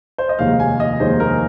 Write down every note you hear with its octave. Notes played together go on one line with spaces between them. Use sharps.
C5
D#5
F1 D#2 D#3 G#3 D#4 F5
G#5
D#5
F1 D#2 D#3 G#3 D#4 C5
A#4